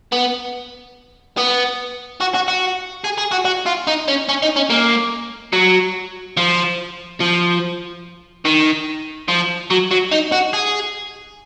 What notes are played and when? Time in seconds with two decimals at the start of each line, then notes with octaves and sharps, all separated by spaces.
0.12 B3
1.37 B3
2.20 F#4
2.34 F#4
2.48 F#4
3.04 G#4
3.18 G#4
3.31 F#4
3.45 F#4
3.66 F4
3.87 D#4
4.08 C#4
4.29 C#4
4.42 D#4
4.56 C#4
4.70 A#3
5.53 F#3
6.37 F3
7.20 F3
8.45 D#3
9.28 F3
9.70 F#3
9.91 F#3
10.11 D#4
10.32 F#4
10.53 G#4